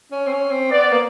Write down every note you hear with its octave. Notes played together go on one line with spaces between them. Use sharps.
C#4
C4
C#4
C4
B3 D5
A#3